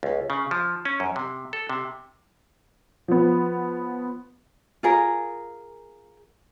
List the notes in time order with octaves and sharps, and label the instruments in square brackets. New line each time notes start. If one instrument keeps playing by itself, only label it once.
[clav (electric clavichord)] C#2
C#3
F3
C#4
F#2
C3
A4
C3
[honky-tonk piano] F3 B3
[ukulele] F4 G#4 A#4